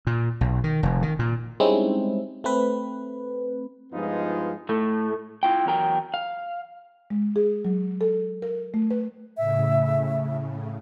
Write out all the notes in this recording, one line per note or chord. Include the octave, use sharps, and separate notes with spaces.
A#2
B1
D#3
F1
D#3
A#2
G3 G#3 C4 C#4 D#4 E4
A3 C4 B4
G2 F3 G#3 B3 D#4 F4
A2 A3
E4 F4 G5
E2 F#3 A#4 G5
F5
G#3
G#4
F#3
A4
A#4
A3
B4
A2 C#3 E5